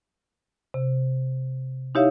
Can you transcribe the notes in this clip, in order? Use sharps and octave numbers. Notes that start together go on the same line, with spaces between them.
C3
D#4 E4 G4 C#5 E5 F5